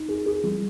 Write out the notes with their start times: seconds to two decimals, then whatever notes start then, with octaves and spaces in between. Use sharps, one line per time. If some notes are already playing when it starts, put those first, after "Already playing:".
Already playing: D#4
0.09 G#4
0.26 G#4
0.44 G3